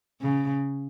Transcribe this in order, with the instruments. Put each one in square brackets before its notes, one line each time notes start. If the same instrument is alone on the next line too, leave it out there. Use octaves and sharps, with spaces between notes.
[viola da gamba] C#3